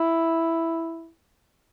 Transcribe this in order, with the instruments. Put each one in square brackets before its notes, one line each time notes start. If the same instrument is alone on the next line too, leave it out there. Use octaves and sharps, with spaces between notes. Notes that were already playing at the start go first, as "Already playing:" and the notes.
Already playing: [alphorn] E4